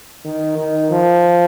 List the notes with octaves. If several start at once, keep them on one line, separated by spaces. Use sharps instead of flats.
D#3
D#3
F3